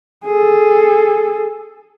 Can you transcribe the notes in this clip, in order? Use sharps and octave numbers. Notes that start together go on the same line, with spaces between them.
G#4 A4